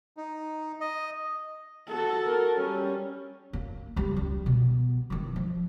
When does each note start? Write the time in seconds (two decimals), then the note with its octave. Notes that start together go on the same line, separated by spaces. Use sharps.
0.17 D#4
0.80 D#5
1.88 F#4 A4
2.25 A#4
2.58 G3 C#4
3.53 A#3
3.96 C#2 G3
4.16 G3
4.46 B2 B3
5.10 D#3 E3
5.36 F3